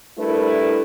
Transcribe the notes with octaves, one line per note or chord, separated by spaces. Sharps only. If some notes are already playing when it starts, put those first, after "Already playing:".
G3 A3 D4 E4 A#4 B4